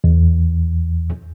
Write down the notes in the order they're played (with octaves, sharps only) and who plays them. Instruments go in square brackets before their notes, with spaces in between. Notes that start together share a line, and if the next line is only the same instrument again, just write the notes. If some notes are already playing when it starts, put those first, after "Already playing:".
[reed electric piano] E2